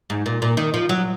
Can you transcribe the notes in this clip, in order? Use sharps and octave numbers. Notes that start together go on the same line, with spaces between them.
G#2
A#2
A#2
D#3
F3
F#3